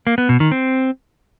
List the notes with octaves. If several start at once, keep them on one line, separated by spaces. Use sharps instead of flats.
A#3
B3
B2
D#3
C4